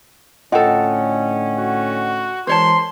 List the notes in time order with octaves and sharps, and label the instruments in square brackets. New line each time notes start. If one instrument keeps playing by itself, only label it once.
[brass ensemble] A2 D3 C#4 [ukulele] F4 A4 [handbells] D#5 F#5 G5
[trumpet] F#4
[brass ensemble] E3 G#3 A#4 [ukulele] C5 C#5 A5 [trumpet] C6